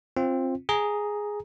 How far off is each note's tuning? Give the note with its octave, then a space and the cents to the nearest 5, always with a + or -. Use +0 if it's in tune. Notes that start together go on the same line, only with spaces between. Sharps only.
C4 +15 F4 +0
G#4 +0 A#5 +0